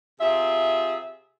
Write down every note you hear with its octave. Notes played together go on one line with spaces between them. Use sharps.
C3 F4 G#4 E5